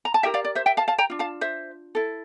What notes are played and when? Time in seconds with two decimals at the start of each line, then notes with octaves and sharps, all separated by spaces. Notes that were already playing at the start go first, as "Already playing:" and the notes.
0.05 A#5
0.14 A5
0.23 E4 G4 A#4 E5 G5
0.34 D5 F5
0.45 D5
0.55 C5 E5
0.66 E5 G5
0.77 F5 A5
0.88 F5 A5
0.98 G5 A#5
1.10 D4 F4
1.19 F5 A5
1.41 C5 E5
1.95 E4 A4